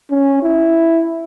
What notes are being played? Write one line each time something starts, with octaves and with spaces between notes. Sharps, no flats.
C#4
E4